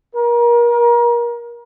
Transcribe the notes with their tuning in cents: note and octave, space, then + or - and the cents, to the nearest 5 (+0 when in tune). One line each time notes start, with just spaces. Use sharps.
A#4 +30